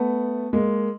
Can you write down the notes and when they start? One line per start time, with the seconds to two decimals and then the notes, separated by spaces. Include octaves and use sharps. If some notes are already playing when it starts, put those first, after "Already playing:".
Already playing: A3 B3
0.53 G#3 A#3